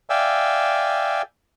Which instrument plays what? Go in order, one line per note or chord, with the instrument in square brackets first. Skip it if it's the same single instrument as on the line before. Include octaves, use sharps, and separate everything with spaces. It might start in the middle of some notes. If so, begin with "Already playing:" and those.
[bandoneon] D5 E5 F5 G5 G#5 E6